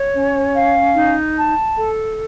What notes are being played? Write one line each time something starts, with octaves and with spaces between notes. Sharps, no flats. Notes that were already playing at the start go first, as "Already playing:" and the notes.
Already playing: C#5
C#4
F5
D#4
A5
A4